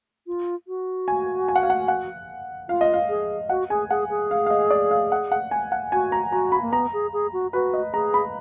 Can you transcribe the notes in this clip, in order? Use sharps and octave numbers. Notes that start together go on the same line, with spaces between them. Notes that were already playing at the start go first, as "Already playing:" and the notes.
F4
F#4
G#5
G#5
F#5
F5
F#5
F#5
F4 F5
D#5
F5
G#4
F#4 F#5
G#4 G#5
G#4 F#5
G#4
F5
F5
D#5
D5
F5
F#5
F#5
G#5
F#5
F#4 G#5
A#5
F#4 A#5
B5
A#3
B3 A#5
G#4
G#4
F#4
F#4 B4
D#5
G#4 A#5
B5